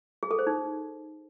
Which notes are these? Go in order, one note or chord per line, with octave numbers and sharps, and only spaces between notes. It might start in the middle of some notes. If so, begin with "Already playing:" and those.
G#4
A4
C5
D#4